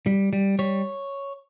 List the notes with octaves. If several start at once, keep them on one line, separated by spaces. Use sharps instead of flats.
G3
G3
G3 C#5